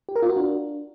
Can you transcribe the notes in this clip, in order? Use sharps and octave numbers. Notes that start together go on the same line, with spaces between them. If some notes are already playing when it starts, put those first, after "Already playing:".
G4
A#4
F4
F#4
D4